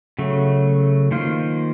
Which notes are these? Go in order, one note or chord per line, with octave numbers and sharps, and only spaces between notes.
C#3 F#3 A3
D#3 A#3 F4 C5